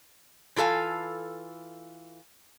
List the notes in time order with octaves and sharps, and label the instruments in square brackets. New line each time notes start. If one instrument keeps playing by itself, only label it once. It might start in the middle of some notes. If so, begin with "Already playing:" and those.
[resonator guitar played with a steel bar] E3 F4 A4 F5 G#5